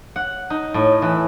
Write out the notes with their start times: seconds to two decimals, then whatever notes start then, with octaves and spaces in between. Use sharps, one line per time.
0.16 F#5
0.50 D#4
0.74 A2
1.02 E3